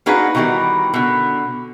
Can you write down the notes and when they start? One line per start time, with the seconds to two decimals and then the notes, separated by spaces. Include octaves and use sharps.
0.06 A#3 D4 D#4 F#4 G#4 B4
0.35 B2 D#3 E3 G3 A#4
0.94 B2 D3